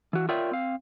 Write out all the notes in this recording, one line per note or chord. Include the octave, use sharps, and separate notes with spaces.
E3 F#4
F4 A#4 C#5 D5 E5 G5
C4 F5